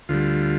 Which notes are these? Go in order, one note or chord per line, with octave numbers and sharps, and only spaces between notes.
D2 D3 G3 F4